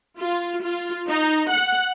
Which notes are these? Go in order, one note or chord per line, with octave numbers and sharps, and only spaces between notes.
F4
F4
D#4
F#5